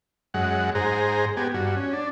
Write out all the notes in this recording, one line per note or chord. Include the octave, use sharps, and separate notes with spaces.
F#2 G#3 F#5
G#2 G#4 C5 A#5
B3 G4 G#5
G2 F#4
C#4
D4